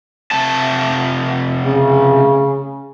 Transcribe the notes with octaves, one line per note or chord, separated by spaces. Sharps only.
C3 A3 A5
C#3